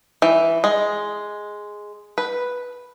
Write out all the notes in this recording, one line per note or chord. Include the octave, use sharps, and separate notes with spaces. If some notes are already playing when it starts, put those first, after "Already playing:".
E3
G#3
B4